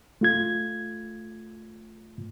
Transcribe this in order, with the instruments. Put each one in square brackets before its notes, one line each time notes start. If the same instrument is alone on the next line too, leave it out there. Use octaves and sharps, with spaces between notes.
[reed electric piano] A3 F4 G#6